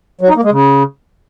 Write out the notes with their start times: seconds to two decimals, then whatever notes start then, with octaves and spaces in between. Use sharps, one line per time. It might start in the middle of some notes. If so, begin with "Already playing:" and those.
0.21 F#3
0.29 D#4
0.36 A#3
0.44 G#3
0.52 C#3